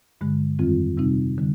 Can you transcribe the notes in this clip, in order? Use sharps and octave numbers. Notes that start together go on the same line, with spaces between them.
G2 D3 G#3
F2 D#3 G3 C4 F4
C3 G3 C4 D#4
D3 G3